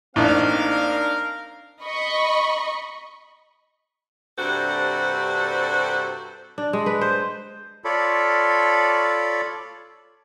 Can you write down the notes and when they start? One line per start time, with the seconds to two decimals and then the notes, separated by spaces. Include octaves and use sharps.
0.16 A1 A#3 C4 D4 D#4 A#4 F5
1.82 D#5 B5 C#6
4.38 G2 C3 D4 F#4 A4 C5
6.58 D4
6.73 G#3
6.86 B4
7.01 C5
7.84 F4 A4 C#5 D5 B5